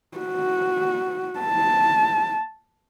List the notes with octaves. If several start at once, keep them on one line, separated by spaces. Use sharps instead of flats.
F#4
A5